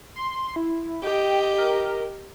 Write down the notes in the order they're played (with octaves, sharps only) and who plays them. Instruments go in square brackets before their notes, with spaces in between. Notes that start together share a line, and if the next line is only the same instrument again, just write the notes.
[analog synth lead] C6
E4
[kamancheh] G4 D#5 [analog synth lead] G5
[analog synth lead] A#4